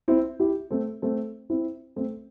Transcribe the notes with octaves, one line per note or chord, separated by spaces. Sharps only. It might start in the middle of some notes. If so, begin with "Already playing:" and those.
C4 E4
E4 G4
A3 C4
A3 C4
C4 E4
A3 C4